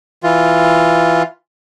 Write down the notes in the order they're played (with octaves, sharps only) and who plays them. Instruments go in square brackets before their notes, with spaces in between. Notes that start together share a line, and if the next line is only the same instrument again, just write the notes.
[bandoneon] E3 F4